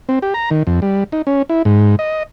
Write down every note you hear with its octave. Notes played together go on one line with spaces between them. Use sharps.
C4
G4
A#5
D#3
F2
G3
D#4
C#4
E4
G#2
D#5